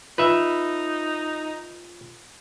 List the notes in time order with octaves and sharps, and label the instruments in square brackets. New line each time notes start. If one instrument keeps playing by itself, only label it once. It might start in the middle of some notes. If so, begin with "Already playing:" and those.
[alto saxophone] D#4 [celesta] F4 [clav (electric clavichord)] B4 E5